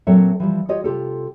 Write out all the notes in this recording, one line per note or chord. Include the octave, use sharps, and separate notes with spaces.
A#2 F#3 C4 A4 C#5 E5
E3 F3 G3
F4 G4 C#5 D#5
C3 F4 G4 A4